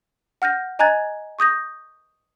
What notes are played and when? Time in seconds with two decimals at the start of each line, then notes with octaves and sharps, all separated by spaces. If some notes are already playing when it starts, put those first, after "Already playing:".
0.42 F#5 F6 G6 A#6
0.79 D#5 G#5 A#5 F#6 G#6 A6
1.39 C#6 D#6 G6 A#6